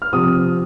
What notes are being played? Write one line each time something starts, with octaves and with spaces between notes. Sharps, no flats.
F6
C3 F3 D#6